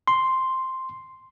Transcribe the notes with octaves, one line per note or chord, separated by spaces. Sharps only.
C6